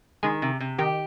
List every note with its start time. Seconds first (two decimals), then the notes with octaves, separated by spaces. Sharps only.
0.23 D#3 G#3 G#4
0.42 C3
0.60 C3
0.78 D#3 D#4 G4